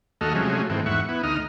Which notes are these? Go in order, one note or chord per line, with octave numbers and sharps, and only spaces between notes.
D#2 A3 F#4 A4 D#5 F6
C3 F3 F#3 G#3 A3 C#4
G#2 D#3 E3 A3 C4
E2 G#2 E5 F#5 C#6
B3 E4
D2 D#4 D#6 F6